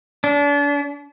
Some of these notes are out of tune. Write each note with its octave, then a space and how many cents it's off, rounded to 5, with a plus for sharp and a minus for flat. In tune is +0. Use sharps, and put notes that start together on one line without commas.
D4 -35